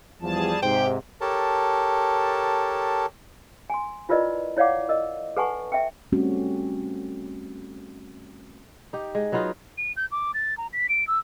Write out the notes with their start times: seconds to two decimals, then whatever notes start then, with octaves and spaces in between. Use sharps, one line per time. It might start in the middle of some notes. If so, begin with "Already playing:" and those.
0.22 E2 F3 G3 G#4 A5
0.63 G#2 C3 G4 C5 G5
1.21 G4 A4 A#4 C#5 A5
3.70 G#5 C6
4.09 E4 F4 A#4 B4 D5 D#5
4.57 E4 C#5 D5 F5 F#5 D6
4.89 A#4 D#5
5.37 A4 B4 F#5 G#5 A5 C#6
5.72 E5 G5
6.12 G3 A3 C4 C#4 F#4 G4
8.93 D#4 G4
9.15 G#3
9.32 F#3 B3 D#4 F4
9.78 D#7
9.97 G6
10.12 D6
10.34 A6
10.58 A#5
10.73 B6
10.89 D7
11.07 E6